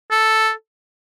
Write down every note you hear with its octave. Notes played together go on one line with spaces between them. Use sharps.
A4